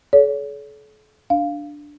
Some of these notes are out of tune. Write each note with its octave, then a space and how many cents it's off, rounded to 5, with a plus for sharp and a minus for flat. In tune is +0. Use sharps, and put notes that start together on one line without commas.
A4 -45 C#5 +40
D4 +0 F5 +0